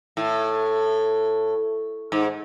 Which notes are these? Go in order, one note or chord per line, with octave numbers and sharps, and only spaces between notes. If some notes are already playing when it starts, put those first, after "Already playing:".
A2
G#2